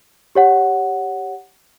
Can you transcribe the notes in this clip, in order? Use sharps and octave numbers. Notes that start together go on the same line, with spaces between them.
G4 C#5 F#5